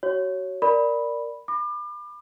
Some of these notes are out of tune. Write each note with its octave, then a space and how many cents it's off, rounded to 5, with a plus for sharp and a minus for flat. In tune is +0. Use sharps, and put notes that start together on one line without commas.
F#4 +30 C#5 +0
A#4 +0 D5 +0 B5 -5
B5 +0 D6 +35